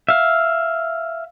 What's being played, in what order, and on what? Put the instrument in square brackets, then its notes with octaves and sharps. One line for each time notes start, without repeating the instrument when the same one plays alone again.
[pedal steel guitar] E5 F5